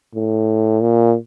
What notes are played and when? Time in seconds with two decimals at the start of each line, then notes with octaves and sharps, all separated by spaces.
0.15 A2
0.81 A#2